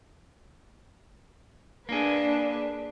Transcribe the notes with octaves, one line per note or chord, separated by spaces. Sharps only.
A#3 D4 G#4 B4